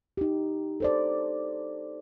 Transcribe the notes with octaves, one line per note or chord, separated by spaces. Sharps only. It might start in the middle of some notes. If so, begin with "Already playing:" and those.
D#4 G4
A4 C5 D5